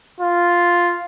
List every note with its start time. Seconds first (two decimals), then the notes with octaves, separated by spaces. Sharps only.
0.21 F4